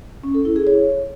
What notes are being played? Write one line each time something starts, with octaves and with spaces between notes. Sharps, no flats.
C#4
A4
E4
G#4
C#5